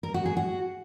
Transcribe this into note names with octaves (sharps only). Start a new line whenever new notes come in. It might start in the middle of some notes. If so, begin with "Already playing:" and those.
A#4
F#4
G#4
F#4